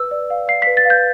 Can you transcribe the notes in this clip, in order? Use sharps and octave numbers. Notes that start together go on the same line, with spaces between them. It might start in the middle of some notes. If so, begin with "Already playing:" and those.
Already playing: B4 E6
D5
F5
F5 C7
B4 B6
A6
F5 G6